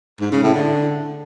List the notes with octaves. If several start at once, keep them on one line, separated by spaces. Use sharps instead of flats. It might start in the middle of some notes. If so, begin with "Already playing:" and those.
G#2
C#3
A2
D3